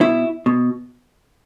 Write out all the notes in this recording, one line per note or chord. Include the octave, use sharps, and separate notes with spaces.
B2 E4
B2